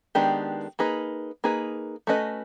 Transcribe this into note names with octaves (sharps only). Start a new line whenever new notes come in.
D#3 G#3 B3 D4 G4
A#3 D#4 G#4 B4
A#3 D#4 G#4 B4
A3 C#4 F#4 B4 D#5